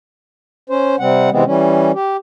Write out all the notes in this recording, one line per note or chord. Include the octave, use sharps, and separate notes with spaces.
C#4 C5
C3 G3 C4 F#5
C3 E3 G#3 B3 C4
E3 G3 C#4
G4